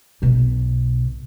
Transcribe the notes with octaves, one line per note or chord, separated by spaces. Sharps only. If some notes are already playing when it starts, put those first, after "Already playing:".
B1 B2